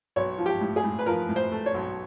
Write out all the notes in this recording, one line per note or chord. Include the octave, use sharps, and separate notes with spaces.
B1 C#5
F3
G4
A2
G#4
A2
B4
F3 A#4
A2
C5
A3
C#5
B1